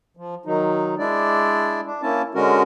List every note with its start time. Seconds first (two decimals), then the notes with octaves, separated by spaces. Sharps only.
0.17 F3
0.45 D#3 F#3 D#4
0.98 G#3 D4 E4 D5
1.85 D4
2.02 A#3 C#4 E4 A5
2.35 D3 G#3 C#4 F#4 A#4